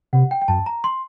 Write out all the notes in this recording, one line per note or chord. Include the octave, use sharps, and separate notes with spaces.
C3 F#5
G5
G5
F#2 A5
A#5
C6